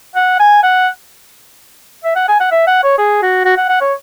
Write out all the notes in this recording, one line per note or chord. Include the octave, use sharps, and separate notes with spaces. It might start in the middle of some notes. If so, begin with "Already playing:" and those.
F#5
G#5
F#5
E5
F#5
G#5
F#5
E5
F#5
C#5
G#4
F#4
F#4
F#5
F#5
C#5